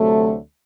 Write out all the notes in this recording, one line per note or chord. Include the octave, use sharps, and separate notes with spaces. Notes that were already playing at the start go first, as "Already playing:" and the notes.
Already playing: D2 C3 F#3 A3